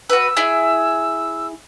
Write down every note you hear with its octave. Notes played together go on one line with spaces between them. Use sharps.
F#4 B4 E6
E4 G#4